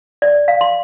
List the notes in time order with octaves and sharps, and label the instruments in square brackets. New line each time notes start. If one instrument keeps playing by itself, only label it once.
[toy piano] D5
F5
C6